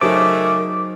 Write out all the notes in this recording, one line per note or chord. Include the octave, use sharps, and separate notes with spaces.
C#3 F#3 A3 D#4 A#4 C5 D6